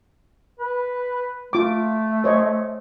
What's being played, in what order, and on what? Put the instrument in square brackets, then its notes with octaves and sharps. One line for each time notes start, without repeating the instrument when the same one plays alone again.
[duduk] B4
[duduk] A3 [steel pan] F4 D6
[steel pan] C5 C#5 D#5